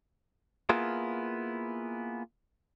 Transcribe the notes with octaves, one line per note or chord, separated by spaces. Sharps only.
A#3 B3 E4 F4 G#4